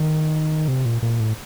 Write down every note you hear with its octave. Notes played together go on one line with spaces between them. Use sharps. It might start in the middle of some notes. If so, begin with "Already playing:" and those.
Already playing: D#3
C3
A#2
A#2
A2